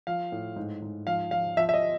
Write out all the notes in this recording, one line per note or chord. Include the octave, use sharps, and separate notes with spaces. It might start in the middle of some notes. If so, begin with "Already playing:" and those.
F3 F5
A2
G#2
G#2
F3 F5
F3 F5
F3 E5
E5
D#5